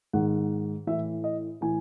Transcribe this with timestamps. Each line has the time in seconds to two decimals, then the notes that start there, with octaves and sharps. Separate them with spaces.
0.13 G#2 D#3 F#5
0.87 A2 E3 E5
1.24 D#5
1.61 A2 E3 G#5